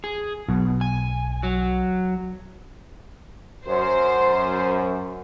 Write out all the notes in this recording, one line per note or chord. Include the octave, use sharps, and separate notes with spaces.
G#4
B1 B2
G#5
F#3
F#2 C5